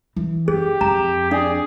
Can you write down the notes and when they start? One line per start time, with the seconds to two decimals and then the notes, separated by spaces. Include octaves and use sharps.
0.16 E3
0.48 F#1 G4 G#4
0.81 F2 A#5
1.31 D4 G#4 D5